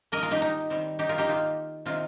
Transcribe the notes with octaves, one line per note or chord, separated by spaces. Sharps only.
D#3 A#3 A#4 D#5
F4 A#4
D#4 G4
D#4
D#3 G3 C4
D#4 G4
F4 A#4
D#4 G4
D#3 A#3 F4
C3 D#3 C4 F4